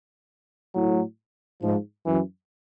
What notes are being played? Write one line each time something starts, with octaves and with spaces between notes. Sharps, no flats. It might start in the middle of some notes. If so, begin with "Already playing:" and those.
A2 F#3
G#2 F3
F#2 E3